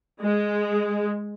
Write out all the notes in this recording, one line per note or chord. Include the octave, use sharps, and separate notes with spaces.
G#3